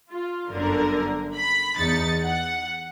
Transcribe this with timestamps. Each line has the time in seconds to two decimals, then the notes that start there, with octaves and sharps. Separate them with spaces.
0.11 F4
0.50 G1 F#2 D3 A#4
1.35 B5
1.78 E2 D#4 A6 C#7
2.23 F#5